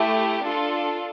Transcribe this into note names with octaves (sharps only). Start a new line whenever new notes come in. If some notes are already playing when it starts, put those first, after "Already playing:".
Already playing: A3 E4 G4
D4 F4 A4